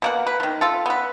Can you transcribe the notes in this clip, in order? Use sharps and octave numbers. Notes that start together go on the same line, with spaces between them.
B2 A#3 F#5
B4
D#3 F3
F4 A4
B3 B4